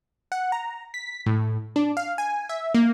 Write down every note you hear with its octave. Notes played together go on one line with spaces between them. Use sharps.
F#5
A#5
B6
A2
D4
F5
G#5
E5
A#3